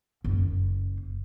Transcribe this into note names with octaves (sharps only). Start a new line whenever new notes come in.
F#1